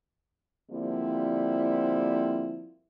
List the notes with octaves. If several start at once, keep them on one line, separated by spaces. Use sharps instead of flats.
D3 F3 G3 A#3 C4 E4